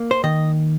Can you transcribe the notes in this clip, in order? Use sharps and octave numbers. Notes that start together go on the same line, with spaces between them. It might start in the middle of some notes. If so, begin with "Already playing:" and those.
Already playing: A#3
C5
D#3 D#5